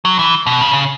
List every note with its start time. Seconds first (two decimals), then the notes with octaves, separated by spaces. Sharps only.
0.05 F#3
0.19 E3
0.46 B2
0.61 C#3
0.73 C#3